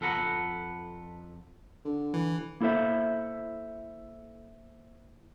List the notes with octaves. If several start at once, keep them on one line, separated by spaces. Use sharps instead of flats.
F2 A4 B4 F#5 A#5
D3
E3
A#3 E4 A4 C5 E5